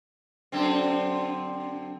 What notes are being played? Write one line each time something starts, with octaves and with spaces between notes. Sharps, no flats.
F#2 D3 C4